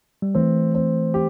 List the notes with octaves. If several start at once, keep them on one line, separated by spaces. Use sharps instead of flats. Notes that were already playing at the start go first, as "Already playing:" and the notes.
G3
E3 A3 C4
C4
G4